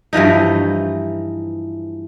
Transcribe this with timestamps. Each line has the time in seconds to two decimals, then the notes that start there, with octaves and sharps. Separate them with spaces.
0.13 G2 E3 F3 D#4